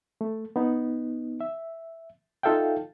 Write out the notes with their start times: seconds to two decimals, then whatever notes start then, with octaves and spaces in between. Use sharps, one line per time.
0.21 A3
0.56 B3 D#4
1.41 E5
2.43 D#4 F4 A4 E5 F5 G5